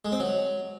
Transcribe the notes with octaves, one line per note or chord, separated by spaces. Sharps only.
G#3
C4
F#3